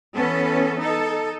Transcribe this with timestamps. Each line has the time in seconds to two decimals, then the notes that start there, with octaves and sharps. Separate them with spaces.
0.16 E3 B3 C#4 A4
0.81 D#4 A4